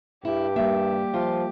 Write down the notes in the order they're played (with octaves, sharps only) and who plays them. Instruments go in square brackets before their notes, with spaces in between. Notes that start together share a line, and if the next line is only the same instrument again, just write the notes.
[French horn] G2 [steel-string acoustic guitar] E4 [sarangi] G4
[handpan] G3 A#3 [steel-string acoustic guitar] E5
[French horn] F3 [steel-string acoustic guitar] F4